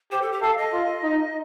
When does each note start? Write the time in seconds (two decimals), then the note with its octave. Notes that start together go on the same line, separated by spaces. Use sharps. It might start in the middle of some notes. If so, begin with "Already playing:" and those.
0.12 G4 C5
0.22 A4
0.32 G4
0.42 A4 F5
0.57 D#5
0.73 F4
1.04 D#4